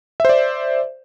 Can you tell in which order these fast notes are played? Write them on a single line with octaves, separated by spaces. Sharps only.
E5 C5 D5